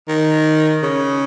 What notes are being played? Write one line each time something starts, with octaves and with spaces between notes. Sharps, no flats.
D#3
C#3